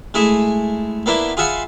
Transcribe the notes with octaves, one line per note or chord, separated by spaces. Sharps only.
G#3 A3 E4 G#4
A#3 B3 D4 E4 B4
F4 G#4 E5 F#5 G#5 B5